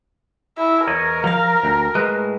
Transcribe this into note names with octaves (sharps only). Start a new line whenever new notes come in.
E4
E2 A#4 C#5 D#5
F3 F5 A#5
D2
A2 G#3 B4